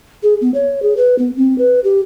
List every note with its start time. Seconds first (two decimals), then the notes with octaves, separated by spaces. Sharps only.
0.23 G#4
0.41 B3
0.54 C#5
0.82 G#4
0.97 B4
1.19 B3
1.37 C4
1.58 B4
1.84 G4